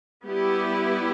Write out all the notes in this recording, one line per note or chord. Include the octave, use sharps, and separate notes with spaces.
G3 B3 E4 G4